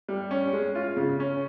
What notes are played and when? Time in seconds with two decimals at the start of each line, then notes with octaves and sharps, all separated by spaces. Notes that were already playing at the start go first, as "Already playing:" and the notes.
0.09 G3
0.31 C#4
0.53 G#3
0.75 F4
0.97 C#3
1.20 C#4